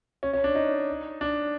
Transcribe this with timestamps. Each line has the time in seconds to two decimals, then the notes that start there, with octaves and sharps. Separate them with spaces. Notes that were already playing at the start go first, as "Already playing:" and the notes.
0.23 C#4
0.33 C#4
0.44 D4
0.55 D#4
1.21 D4